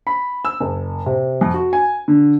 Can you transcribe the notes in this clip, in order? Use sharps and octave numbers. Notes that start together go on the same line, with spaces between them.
B5
E6
F#1
C3
F2
F#4
G#5
D3